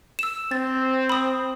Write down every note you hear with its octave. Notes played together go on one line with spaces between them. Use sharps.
E6 E7
C4 A6
B5 D#6